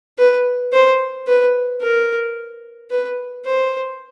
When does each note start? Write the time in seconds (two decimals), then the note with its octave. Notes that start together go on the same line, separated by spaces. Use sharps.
0.18 B4
0.72 C5
1.27 B4
1.82 A#4
2.90 B4
3.45 C5